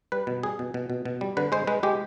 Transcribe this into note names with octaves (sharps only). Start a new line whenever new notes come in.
G3 B4
B2
G3 G#4
B2
B2
B2
B2
G3
D3 B4
G#3 C5
G#3 B4
G#3 G4